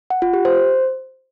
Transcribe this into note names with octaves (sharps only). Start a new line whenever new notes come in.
F#5
F4
G4
C5